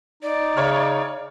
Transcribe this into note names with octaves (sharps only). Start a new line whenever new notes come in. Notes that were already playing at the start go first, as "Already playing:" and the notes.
D#4 D5
C#3 C#5 E5 F6